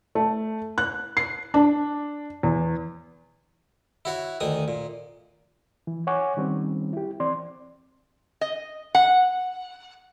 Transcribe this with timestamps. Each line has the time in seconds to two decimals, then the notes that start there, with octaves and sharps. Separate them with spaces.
0.15 A3
0.78 F#6
1.17 C7
1.54 D4
2.43 E2
4.05 E4 F#4 C#5
4.40 D2 D#3 G#5 D#6
4.68 A#2
5.87 E3
6.07 C#5 F#5 G#5 C#6 D6
6.37 D#3 G3 C4 C#4
6.93 E4 G4
7.20 E3 C4 D5 C6
8.41 D#5
8.95 F#5